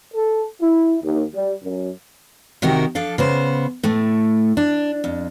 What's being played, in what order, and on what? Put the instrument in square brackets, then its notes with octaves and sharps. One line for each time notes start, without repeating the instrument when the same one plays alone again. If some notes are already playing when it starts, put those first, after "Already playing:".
[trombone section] A4
E4
D#2
G3
F#2
[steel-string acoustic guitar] C3 D#3 F#4 G4 A#4
F3 D4 A4 F5
C#3 B3 C5
A2 A3
D4
F2